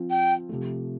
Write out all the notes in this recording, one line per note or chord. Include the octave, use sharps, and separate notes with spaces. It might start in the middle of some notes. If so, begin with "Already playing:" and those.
Already playing: F3 C4 F4
G5
C3 F3 A3